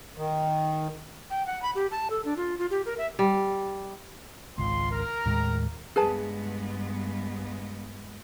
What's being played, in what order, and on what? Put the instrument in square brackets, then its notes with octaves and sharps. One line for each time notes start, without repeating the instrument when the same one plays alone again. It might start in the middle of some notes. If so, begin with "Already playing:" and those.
[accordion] D#3
[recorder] G5
F#5
B5
G4
A5
A4
D4
F4
F4
G4
A#4
E5
[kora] G3
[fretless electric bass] G#1 C#2 [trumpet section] F4 C6
[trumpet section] A#4
[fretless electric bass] D#2 A2 G#3
[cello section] G2 G#3 B3 [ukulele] G#4 B4 A5